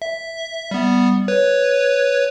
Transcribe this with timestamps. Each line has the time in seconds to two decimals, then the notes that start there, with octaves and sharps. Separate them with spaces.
0.02 E5
0.71 G3 B3
1.28 B4 C#5